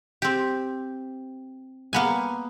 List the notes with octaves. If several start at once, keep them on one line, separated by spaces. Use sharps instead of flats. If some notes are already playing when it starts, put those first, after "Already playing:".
C4 G4
A#3 B3 G#5